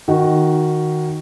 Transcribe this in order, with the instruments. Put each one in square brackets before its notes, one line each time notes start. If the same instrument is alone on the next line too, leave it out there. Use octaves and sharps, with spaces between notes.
[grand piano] D#3 F#4